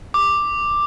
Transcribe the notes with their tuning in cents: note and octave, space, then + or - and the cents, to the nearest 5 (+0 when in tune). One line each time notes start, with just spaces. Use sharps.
D6 +5